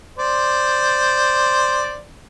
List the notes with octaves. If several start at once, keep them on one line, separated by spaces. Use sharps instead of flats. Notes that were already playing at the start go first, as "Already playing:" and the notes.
C5 D5